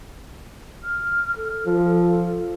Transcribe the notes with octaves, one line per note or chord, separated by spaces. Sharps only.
F6
A4
F3